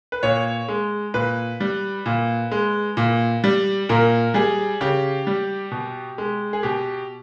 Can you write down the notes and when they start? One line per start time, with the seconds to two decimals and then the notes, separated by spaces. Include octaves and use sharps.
0.12 B4
0.23 A#2 C#5
0.68 G#3
1.14 A#2 B4
1.60 G3
2.06 A#2
2.52 G#3
2.97 A#2
3.44 G3
3.89 A#2 A#4
4.34 G3 G#4
4.81 C#3 G4
5.27 G3
5.71 B2
6.18 G#3
6.53 G#4
6.63 B2 G4